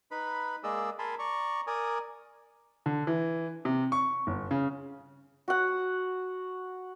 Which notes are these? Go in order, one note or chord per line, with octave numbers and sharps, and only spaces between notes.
D#4 B4 B5
G#3 A#3 G#4 D5 D#5 E6
A#4 G#5 A5 B5 C6
D5 A#5 C#6
A#4 D5 G#5 D#6
D3
E3
C3
C#6
G1
C#3
F#4 F#5